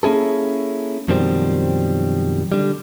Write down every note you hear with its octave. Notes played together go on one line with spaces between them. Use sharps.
A#3 C#4 E4 G#4 A4
F#2 B2 D#3 F3 G3 C4
D3 G3